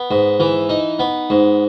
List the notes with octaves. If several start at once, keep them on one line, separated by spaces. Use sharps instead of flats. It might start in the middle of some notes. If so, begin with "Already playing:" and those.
Already playing: B3
G#2
E3
D#4
B3
G#2